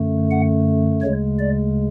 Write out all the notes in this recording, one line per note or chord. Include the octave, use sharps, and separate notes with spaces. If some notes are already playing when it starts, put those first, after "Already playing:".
Already playing: F#2 D3 A3
F#5
D2 C#3 G#3 C#5
D5